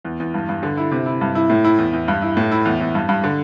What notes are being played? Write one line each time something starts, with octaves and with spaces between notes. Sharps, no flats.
E2
E2
G2
G2
D3
E4
C3
E4
G2
E4
A2
E4
E2
E2
G2
E4
A2
E4
E2
E2
G2
G2
D3